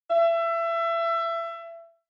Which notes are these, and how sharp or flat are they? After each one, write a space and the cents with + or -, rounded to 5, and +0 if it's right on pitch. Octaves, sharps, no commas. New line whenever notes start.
E5 +25